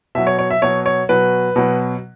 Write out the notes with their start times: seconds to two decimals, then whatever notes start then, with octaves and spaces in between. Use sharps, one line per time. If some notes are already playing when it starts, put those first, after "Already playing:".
0.15 B2 F#3 E5
0.27 C#5
0.39 C#5
0.51 E5
0.62 B2 F#3 C#5
0.86 C#5
1.09 B2 F#3 B4
1.56 B2 F#3